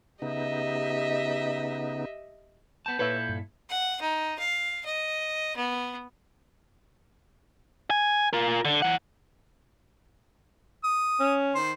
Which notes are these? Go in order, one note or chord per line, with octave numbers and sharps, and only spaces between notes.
C#3 B3 D#4 G4 D#5 E5
B3 A5 G6
A#2 E4 A4 B4 C#5 E5
G2
F#5
D#4
F5
D#5
B3
G#5
F4 A#4
D3
E3 F#5
D#6
C#4
D#3 C5